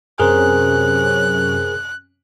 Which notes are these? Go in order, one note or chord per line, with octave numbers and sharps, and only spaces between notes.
F#2 C3 C#4 G#4 A#4 C5 F#6